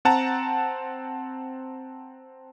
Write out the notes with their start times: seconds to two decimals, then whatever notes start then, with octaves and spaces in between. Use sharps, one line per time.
0.05 C4 F#5 A5 A#5